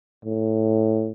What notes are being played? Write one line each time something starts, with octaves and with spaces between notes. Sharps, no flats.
A2